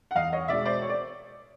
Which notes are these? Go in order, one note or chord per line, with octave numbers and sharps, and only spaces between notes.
F#5
E2 D#5 F5
C#5 D#5
B2 G#3 D5 E5
C5 D5
C#5
D5